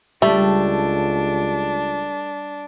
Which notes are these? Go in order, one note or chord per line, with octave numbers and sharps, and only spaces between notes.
C#2 G3 A3 D4